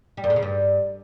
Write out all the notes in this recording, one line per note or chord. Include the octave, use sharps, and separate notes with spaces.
G3
F#2
A2
C#3
G2